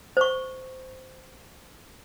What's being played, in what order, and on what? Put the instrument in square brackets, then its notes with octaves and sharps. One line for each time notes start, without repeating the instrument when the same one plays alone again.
[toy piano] C5 C#6